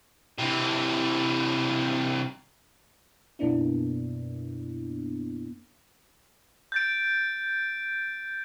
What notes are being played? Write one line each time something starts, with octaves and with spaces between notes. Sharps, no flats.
C3 E3
F#2 B2 A#3 B3 D4 E4
G6 A6 D7